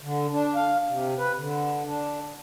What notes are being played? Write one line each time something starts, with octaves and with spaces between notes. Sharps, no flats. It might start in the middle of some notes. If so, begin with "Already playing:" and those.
D3
D4
F5
C3
B4
D3
D4